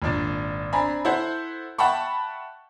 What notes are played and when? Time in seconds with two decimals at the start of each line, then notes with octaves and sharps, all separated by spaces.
0.02 G#1 A#2 D4 D5
0.73 C4 D4 G#5 A#5 B5
1.05 E4 A4 C5 F#5
1.78 E5 F#5 G5 A5 B5 C#6